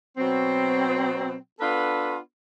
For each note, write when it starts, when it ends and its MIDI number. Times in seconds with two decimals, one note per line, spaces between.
0.17 1.35 47
0.17 1.35 54
0.17 1.35 60
1.60 2.18 59
1.60 2.18 62
1.60 2.18 65
1.60 2.18 69
1.60 2.18 71